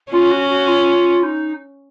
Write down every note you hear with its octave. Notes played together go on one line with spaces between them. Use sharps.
C#4 F4
F#4
F#4
F4
D#4